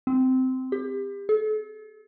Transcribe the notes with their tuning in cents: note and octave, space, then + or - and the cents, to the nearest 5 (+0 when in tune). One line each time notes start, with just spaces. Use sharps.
C4 -15
G4 +30
A4 -40